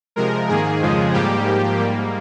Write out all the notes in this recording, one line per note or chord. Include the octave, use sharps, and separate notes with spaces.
C3 F3 G#3 A#4
G#2 D#3 A#3 G#4
F2 C#3 F3 G#3
G#2 G3 A#3 G4
G#2 F3 A#3
G#2 G3 A#3